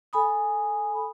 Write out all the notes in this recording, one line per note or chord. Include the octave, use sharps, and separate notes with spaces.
A4 G#5 B5 D#6